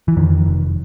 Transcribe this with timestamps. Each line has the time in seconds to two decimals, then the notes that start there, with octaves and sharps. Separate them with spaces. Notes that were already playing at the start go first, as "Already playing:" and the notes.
0.08 E3
0.17 F2 D#3
0.46 F1